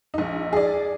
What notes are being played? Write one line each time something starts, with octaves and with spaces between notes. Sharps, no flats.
A#1 D#4
G#4 D5